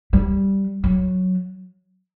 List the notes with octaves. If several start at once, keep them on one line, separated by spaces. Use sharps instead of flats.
G3
F#3